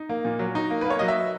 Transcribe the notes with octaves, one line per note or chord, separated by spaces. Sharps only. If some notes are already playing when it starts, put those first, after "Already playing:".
Already playing: D#4
A#3
A#2
F#3
D#4
A#3
A#3 B4
C#5
F#3 D#5
E5